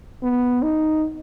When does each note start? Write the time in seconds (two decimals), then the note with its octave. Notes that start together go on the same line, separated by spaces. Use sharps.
0.23 B3
0.63 D#4